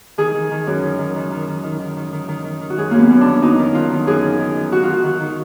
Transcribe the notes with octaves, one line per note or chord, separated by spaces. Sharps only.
D#3 G#4
D#3
D#3
F#2
D#3
D#3
D#3
D#3
D#3
D#3
D#3
D#3
D#3
D#3
D#3
D#3
F#4
F#2 G#4
F#2 A#3
B3
F#2
D#3 D4
F#2 D#4
D#3
F#2 F4
D#3
F#2 G#4
D#3
D#3
D#3
D#3 F#4
F4
D#3 F#4
D#3
D#3